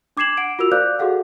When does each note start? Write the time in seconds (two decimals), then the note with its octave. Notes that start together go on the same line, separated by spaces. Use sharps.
0.17 D4 D6 G#6 C7 E7 F#7
0.37 F#5 D7
0.59 F4 F#4 A#4 E6 F7
0.72 C5 D5 F5 D6 F#6 G6
0.99 F#4 G#4 A4 F5 F#5